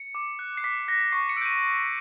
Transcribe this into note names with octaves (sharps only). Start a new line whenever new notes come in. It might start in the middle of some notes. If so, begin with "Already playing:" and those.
Already playing: C#7
D6
F#6
C7
D6 B6
F#6 A#6
B6
C#6 C7
C#7
E6 G6 D7 D#7